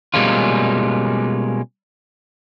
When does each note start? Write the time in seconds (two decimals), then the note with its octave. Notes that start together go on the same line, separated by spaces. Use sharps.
0.14 B2 G3 G#3 A#3 C#4 F4